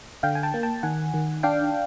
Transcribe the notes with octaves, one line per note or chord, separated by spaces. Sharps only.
D3 F5 G5
G#5
G5 A5
A#3
G5 A5
D#3 F#5 G#5
D#3
D4 F5 G5